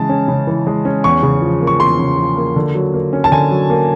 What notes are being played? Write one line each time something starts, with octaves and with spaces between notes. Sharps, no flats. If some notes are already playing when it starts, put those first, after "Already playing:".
Already playing: C#3 E3 G#3 A5
C#4
C#3
E3
G#3
C#4
E2 C#6
C#3
F3
A#3
C#6
E2 C6
C#3
F3
A#3
D3
F#3
A#3
C#4
A5
D3 G#5
F#3
A#3